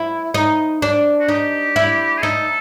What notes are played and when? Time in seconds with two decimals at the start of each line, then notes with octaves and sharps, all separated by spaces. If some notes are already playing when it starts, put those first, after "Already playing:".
Already playing: E4
0.34 D#4
0.82 D4
1.20 F#4
1.28 D#4 G4
1.76 E4
2.18 G#4
2.23 D#4 A4